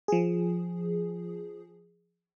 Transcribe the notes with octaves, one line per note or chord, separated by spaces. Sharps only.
F3 G#4